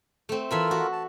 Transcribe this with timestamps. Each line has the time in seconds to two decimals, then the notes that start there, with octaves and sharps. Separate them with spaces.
0.29 A3 C4
0.51 E3 F4 A4 A#4 E5 B5
0.71 F#4
0.92 A5